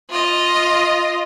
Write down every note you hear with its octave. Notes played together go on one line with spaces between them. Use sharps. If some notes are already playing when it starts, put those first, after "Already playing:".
F4 D#5